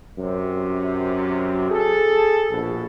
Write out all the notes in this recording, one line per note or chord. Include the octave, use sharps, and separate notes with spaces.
F#2 C3
G#4 A4
A#1 B2